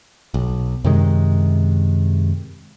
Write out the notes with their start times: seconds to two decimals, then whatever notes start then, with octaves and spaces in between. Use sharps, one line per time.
0.34 B1
0.84 F#2 C3 D#3 G#3